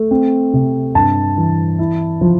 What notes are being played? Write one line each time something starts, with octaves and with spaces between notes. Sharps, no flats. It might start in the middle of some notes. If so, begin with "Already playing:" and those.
Already playing: A3
C4
C3
G2 A5
E3
E4
F3